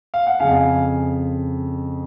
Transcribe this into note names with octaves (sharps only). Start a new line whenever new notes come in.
F5
F#5
F2 C#3 F5 G#5